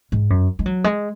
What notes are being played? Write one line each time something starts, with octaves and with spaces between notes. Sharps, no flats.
G#2
F#2
G#3
F#3
G#3